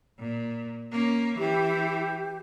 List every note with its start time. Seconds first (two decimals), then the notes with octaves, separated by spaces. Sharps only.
0.19 A#2
0.92 A#3 C#4
1.39 E3 G4